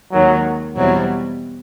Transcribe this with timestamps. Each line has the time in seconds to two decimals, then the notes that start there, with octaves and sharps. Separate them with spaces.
0.12 D#2 D#3 F#3 G#3
0.75 E2 B2 F#3 G3 C4 E4